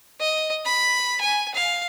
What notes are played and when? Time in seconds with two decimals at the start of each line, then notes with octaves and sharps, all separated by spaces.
0.20 D#5
0.66 B5
1.21 G#5
1.55 F5